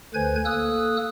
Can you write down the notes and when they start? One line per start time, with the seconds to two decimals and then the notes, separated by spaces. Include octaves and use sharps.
0.14 D2 D3 B4 C5 G#5 G#6
0.45 A#3 A4 D#6 E6 F#6